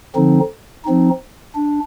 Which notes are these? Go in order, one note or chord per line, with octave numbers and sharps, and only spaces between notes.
D3 F3 C4 D#4
F3 C4 D#4
D4